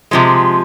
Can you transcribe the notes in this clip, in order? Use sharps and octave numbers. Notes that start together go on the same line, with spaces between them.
C3 F3 G#3